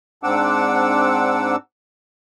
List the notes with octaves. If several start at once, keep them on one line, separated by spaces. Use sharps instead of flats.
G#2 C4 D4 F#5 D6 E6